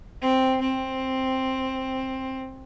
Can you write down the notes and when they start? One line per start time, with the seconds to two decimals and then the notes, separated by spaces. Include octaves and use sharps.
0.22 C4
0.61 C4